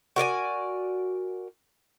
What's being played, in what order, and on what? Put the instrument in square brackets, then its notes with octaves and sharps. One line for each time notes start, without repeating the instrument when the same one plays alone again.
[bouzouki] F#4 A#4 D5 G#5